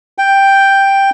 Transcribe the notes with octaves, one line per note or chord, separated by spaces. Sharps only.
G5